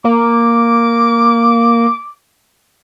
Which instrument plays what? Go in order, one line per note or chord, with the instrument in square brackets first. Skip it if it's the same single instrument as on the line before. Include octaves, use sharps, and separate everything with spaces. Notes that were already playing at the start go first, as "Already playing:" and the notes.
[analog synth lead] A#3 [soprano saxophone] D6